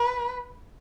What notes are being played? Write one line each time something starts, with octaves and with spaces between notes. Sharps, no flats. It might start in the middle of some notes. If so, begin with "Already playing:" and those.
Already playing: B4